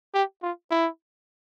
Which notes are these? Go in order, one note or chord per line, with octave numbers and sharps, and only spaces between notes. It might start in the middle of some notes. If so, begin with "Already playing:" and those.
G4
F4
E4